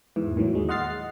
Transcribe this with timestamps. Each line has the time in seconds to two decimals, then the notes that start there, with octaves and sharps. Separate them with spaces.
0.16 E2 G#2 E3
0.36 A2 D#3 E3 F#3
0.53 D#2 G#3
0.69 D#5 F#5 C6 F6 A6 C7